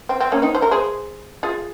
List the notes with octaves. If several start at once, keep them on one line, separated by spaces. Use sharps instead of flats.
C4
C4
A#3 C#4
C4 D#4
C5
A#4
G#4 C5
F4 G#4